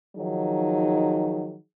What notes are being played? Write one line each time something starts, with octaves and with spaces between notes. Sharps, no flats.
D#3 F3 F#3 D#4 G#4